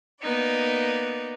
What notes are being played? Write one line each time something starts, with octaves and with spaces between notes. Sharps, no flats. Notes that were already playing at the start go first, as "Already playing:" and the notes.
A#3 B3 D#4 D5